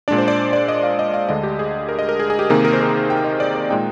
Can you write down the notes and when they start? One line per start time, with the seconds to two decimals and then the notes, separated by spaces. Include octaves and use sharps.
0.08 A#2 G#3 D4 D5
0.18 C5
0.28 D5
0.53 D5
0.68 D#5
0.83 F5
0.99 D#5
1.14 F5
1.29 D2 D3 G#3 D4 D#5
1.43 G4
1.59 G#4
1.89 A#4
1.99 D#5
2.09 A#4
2.20 G#4
2.30 G#4
2.39 G4
2.50 C3 D#3 A#3 D#4 G#4
2.65 A#4
2.73 C5
2.82 A#4
3.10 G5
3.24 D#5
3.40 D5
3.55 A#4
3.70 A#2 G#3 D#4 G5